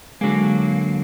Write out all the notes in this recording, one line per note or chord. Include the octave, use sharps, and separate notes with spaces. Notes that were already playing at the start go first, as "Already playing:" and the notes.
D3 F#3 G#3 A#3